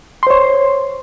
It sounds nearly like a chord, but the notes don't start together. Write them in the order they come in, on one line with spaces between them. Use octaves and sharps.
C6 C5 C#5